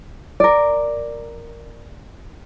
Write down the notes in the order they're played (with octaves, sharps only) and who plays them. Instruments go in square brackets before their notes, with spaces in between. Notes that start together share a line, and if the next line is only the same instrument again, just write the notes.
[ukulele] A#4 D5